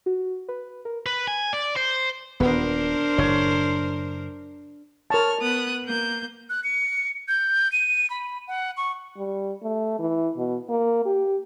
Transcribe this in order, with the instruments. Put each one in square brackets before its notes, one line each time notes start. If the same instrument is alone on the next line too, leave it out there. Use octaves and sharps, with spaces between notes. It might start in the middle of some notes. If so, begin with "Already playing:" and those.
[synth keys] F#4
B4
A#4
[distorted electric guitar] B4
G#5
D5
C5
[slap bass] D#1 [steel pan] B3 [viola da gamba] D4 A#4 C5
[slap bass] F#1 A2 [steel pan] C#5
[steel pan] A#4 A5 [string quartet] C#5 F6
[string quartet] B3 D#6 F#6
A#3 G6
[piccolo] F#6
C#7
G6
D#7
B5
F#5
C#6
[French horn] G3
A3
E3
B2
A#3
G4